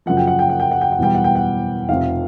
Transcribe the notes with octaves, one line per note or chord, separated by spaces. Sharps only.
F#2 C#3 F3 F#5
G5
F#5
G5
F#5
G5
F#5
G5
F#5
E2 B2 G3 G5
F#5
G5
F#5
F1 F2 C3 F5